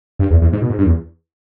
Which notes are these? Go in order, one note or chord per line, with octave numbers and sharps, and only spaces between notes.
G2
E2
E2
G#2
B2
G#2
G2
E2